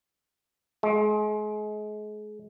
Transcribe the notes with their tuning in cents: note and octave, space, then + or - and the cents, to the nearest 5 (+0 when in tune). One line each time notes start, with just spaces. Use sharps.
G#3 +30